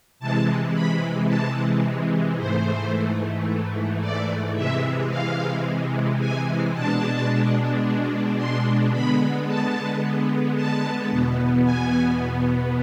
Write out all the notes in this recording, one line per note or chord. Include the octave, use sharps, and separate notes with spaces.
C3 E3 G#3 A5
B5
A5
G#2 E3 A3 C5
D5
C3 E3 G#3 E5
F5
G#5
B2 G#3 D4 A5
C6
D3 G#3 B3 B5
A5
A5
E2 B2 B3
G#5